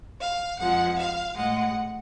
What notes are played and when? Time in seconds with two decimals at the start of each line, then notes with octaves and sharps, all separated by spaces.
0.19 F5
0.58 F2 F3 G#3 F#5
0.97 F5
1.36 A2 G#3 F#5